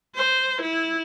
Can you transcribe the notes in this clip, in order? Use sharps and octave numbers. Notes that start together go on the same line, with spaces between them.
C5
E4